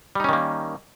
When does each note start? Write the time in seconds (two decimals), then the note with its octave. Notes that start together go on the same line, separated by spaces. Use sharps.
0.15 G3
0.20 D#4
0.24 C#4
0.29 D#3
0.33 A#3